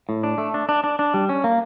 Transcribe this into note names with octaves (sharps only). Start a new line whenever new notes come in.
A2
D4
A3
D4
D4
D4
D4
G3
C#4
A#3